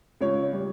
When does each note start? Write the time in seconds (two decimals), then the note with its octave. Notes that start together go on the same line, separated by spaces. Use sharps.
0.21 C#2 C#5
0.53 G3